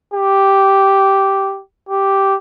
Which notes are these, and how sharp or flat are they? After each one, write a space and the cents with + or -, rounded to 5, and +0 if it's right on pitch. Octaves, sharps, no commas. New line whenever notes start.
G4 -5
G4 -5